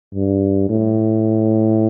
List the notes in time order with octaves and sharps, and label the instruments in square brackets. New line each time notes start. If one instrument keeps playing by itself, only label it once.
[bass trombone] G2
A2